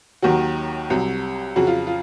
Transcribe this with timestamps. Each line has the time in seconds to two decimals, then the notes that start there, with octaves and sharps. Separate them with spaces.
0.22 D#2 D#3 F#3 F#4
0.90 C2 C3 F#3
1.56 F2 C#3 F#3 F#4
1.67 F4
1.87 F4